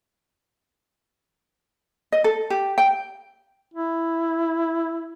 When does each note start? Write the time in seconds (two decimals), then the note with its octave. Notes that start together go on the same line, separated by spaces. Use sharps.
2.12 D#5
2.24 A4
2.50 G4
2.78 G5
3.74 E4